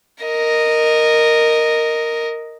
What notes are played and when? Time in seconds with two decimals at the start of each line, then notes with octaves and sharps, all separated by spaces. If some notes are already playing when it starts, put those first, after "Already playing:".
0.24 A#4 D#5